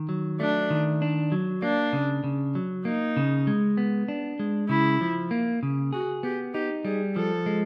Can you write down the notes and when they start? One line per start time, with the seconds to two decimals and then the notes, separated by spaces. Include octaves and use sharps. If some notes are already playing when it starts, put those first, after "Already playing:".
Already playing: D#3
0.09 F#3
0.40 A3 D4
0.70 D#3
1.02 D4
1.32 F#3
1.62 A#3 D4
1.93 C#3
2.24 C#3
2.55 F#3
2.85 A#3 D#4
3.17 C#3
3.47 G#3
3.77 B3
4.08 D4
4.39 G#3
4.69 C#3 E4
5.01 F3
5.31 A#3
5.63 C#3
5.93 F#4 G#4
6.23 B3 G4
6.54 D#4 G4
6.85 G3 G#4
7.16 F3 A4
7.46 G#3